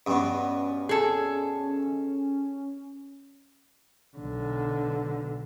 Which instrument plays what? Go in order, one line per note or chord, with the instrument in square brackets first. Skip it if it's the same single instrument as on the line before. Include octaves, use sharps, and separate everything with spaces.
[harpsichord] G2 B2 [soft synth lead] C#4
[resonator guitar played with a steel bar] G#4 A4
[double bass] B1 D3